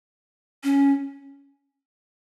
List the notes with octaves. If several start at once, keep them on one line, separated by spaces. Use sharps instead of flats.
C#4